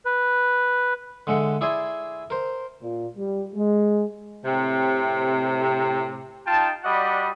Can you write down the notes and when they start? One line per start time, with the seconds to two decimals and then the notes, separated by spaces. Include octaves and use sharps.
0.05 B4
1.27 D3 G#3 E5 F#5
1.61 E4 G#4 D5 E5 G#5 C6
2.30 A#4 C5
2.81 A#2
3.17 G3
3.55 G#3
4.45 A2 C3
6.47 D#4 F4 G5 A5
6.84 G3 F#4 D5 D#5 F#5 B5